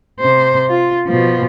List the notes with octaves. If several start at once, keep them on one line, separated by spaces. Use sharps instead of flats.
C3 C5
F4
B2 F3